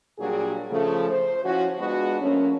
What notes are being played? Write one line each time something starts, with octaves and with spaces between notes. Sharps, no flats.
A#2 F#3 G3 D4 F#4 G#4
C#3 F3 A3
C5
F3 C#4 E4 F#4
G#3 B3 D4 F4 F#4
F3 A3 A#3 C#4